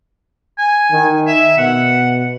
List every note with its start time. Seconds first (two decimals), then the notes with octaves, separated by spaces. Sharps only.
0.58 G#5
0.91 D#3
1.27 E5
1.58 B2 F#5